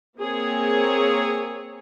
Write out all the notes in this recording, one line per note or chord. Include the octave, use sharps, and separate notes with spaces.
A#3 C4 G#4 C#5